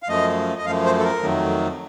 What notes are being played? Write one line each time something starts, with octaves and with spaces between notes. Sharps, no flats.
F5
F#2 F3 A3 D#5
D#5
F#2 F3 A3 F5
C5
A4
A#4
F2 D#3 F#3 A3